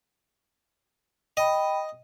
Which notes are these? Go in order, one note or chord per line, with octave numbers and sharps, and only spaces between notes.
D#5 G5 B5